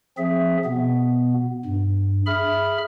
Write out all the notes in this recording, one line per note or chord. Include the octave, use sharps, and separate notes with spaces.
F3 C4 G#4 E5
B2 B3
G2
G#4 E5 B5 F6